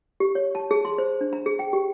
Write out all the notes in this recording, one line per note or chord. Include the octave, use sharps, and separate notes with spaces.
G4
C#5
A5
G#4
C6
C5
D4
A#5
G#4
G5
G4